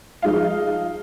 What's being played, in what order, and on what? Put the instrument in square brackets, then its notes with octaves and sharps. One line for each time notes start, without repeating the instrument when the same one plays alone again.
[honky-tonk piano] F3 G#3 D#4 F5